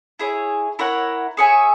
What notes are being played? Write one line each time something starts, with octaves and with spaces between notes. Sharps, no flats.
E4 G#4 C#5
E4 A#4 C#5 F#5
G#4 C#5 E5 G#5